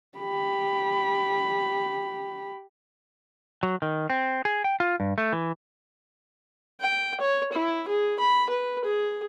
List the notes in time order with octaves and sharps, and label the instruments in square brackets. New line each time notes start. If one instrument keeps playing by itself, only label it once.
[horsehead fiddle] G4 B5
[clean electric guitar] F#3
D#3
C4
G#4
G5
F4
G2
A3
E3
[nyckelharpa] G5
C#5
E4
G#4
B5
B4
G#4